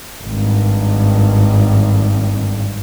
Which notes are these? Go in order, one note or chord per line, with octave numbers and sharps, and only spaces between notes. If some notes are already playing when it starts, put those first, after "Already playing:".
G#1 G2